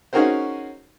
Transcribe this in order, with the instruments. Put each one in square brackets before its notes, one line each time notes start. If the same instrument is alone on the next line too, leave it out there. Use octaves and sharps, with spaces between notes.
[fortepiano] C#4 D#4 F#4 G#4 A#4 C5